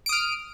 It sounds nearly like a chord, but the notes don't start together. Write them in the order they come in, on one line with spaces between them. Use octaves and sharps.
D7 D#6 F6